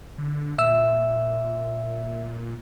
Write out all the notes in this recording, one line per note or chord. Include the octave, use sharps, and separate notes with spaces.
D3
A#2 E5 E6